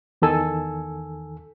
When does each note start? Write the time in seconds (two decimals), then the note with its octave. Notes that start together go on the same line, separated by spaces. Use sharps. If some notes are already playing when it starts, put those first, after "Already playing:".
0.22 E2 D#3 A4 G#5 E6